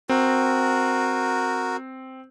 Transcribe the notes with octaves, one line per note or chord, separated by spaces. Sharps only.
C4 F#4 A#4